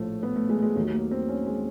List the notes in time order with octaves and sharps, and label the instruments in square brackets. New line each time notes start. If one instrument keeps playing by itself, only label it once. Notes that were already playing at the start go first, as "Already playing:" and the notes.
Already playing: [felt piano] A#1 A2 F3 A3
B3
A3
G#3
G#3
D#2 D#3 F#3 A3
A#3
C4
C#4
G#3